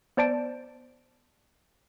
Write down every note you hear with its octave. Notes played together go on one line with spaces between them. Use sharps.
B3 C5 D5 A5 D7